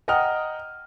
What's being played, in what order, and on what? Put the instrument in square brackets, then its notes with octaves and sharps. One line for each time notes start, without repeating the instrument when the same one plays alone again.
[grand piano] D#5 F#5 G5 A#5 D#6 F6